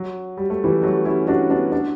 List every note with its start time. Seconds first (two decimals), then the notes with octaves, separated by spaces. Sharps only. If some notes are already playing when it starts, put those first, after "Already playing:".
Already playing: F#3
0.37 G3
0.50 A3
0.64 E3 G3
0.82 F#3 A3
1.04 C#4 E4
1.27 D4 F#4
1.50 B3 D4
1.72 D4 F#4